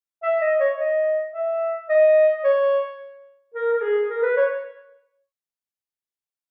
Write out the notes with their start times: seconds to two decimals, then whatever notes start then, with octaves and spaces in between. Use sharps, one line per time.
0.23 E5
0.41 D#5
0.60 C#5
0.79 D#5
1.33 E5
1.89 D#5
2.44 C#5
3.54 A#4
3.73 A#4
3.82 G#4
4.09 A#4
4.23 B4
4.36 C#5